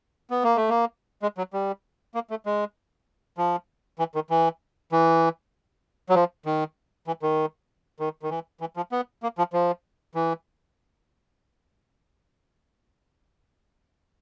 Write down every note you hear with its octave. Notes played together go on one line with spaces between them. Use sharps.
B3
A#3
A3
A#3
G#3
F#3
G3
A#3
A3
G#3
F3
E3
D#3
E3
E3
F#3
F3
D#3
E3
D#3
D#3
D#3
E3
E3
F3
B3
A#3
F3
F3
E3